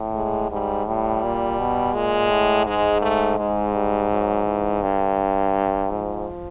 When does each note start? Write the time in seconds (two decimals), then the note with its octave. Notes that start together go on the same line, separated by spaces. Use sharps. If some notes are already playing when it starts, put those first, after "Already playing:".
Already playing: A2
0.15 G#3
0.51 G#2 G3
0.87 A2 G3
1.23 A#2
1.59 B2
1.95 A#2 G#3
2.30 A2
2.66 G#2 G#3
3.02 A3
3.38 G#2 G#3
3.74 G3
4.11 F#3
4.46 E3
4.82 G2 D3
5.90 G#2 F3